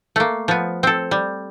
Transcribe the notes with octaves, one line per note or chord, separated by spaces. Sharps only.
A3 A#3
F3 B3
C4 A4
G3